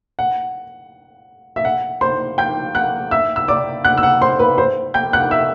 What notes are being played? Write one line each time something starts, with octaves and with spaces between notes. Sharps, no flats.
F#5
E5
F#5
C5 C6
G5 G6
F#5 F#6
E5 E6
E6
D5 D6
F#5 F#6
E6
F#5 F#6
C5 C6
B4 B5
C5 C6
G5 G6
F#5 F#6
E5 E6